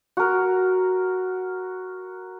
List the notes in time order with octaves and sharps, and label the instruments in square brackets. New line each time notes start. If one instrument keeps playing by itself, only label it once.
[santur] F#4 A#4